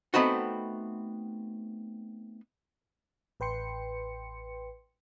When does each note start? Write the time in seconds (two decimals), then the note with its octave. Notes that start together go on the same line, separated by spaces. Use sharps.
0.14 A3 B3 C4 D#4 F#4
3.40 A1 B4 G5 C6 C#7